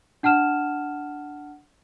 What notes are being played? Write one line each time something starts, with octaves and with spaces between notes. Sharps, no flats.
D4 F#5 A5 F6 E7